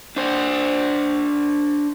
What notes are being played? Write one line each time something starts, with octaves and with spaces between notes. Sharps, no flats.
D4 C5